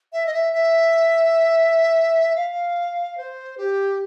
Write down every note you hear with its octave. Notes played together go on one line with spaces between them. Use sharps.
E5
D#5
E5
E5
F5
C5
G4